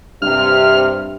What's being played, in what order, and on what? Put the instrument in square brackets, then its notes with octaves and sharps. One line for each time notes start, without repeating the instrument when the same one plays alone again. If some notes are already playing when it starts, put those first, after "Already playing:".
[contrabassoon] G2 [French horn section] C3 [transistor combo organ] F6